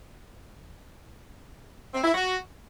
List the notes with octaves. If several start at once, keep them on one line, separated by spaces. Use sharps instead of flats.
C4
E4
F#4